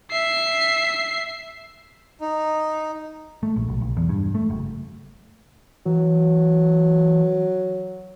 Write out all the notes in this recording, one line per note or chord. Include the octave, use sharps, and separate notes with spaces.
E5 C7
D#4
A3
A#1
B1
B1
E2
G2
A3
F#1
E3 F#3